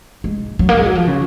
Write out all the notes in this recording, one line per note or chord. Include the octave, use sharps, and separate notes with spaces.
G#3
F#3
A#3
G#3
F#3
F3
C#3